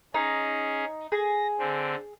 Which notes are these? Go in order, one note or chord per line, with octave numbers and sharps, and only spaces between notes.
C#4 D#4 G#4
G#4 A#6
D3 C4